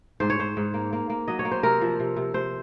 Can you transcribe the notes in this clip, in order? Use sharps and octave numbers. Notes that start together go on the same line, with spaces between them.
G#2 C5
C#5
G#2 C5
G#2
A#3
A#3
A#3
F#3 D#5
C#5
A#3
C5
C3 A#4
F3
C3
C3
C3 C5